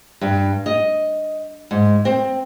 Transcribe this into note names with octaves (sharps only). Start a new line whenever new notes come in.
G2
D#5
G#2
C4